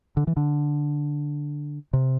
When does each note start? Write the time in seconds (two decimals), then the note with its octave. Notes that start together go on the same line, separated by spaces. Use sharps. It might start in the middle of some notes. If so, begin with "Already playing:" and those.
0.17 D3
0.27 E3
0.37 D3
1.93 C3